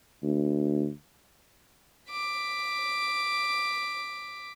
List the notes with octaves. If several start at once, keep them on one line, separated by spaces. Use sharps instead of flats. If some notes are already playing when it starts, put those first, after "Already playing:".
D2
D6 B6